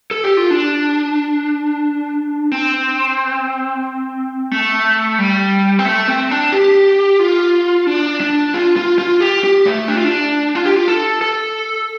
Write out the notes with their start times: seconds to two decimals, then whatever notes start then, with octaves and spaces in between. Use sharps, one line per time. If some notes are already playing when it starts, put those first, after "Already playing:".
0.11 A4
0.24 G4
0.37 F4
0.51 D4
2.52 C4
4.51 A3
5.19 G3
5.79 C4
5.85 A3
6.08 C4
6.31 D4
6.52 G4
7.19 F4
7.87 D4
8.21 D4
8.54 F4
8.77 F4
8.99 F4
9.20 G4
9.44 G4
9.66 A3
9.88 D4
9.96 F4
10.05 D4
10.55 F4
10.65 G4
10.76 F4
10.88 A4
11.21 A4